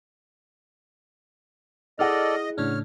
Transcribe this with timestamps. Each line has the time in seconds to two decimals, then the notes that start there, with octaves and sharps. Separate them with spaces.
1.99 E4 G#4 A4 D5 D#5 F#5 F6
2.58 A2 C#3 D4 C#5 F6